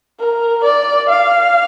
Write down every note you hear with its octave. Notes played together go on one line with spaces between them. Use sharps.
A#4
D5
F5